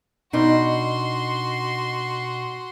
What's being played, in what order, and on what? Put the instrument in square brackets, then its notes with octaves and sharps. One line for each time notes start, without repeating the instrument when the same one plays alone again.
[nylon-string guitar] B2 D4 D#4 [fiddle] F#4 C6